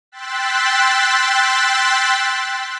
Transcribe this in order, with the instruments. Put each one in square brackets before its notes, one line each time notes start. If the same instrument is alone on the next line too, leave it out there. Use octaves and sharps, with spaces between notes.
[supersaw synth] G5 C6 E6 F#6 A6 B6